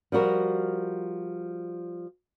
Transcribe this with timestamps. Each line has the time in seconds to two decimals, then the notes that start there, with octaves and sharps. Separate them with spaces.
0.12 F3 G3 F#4 A#4